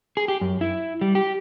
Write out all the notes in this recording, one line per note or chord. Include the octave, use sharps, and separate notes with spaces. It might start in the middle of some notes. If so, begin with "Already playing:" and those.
G#4
G4
F#2
E4
G3
G4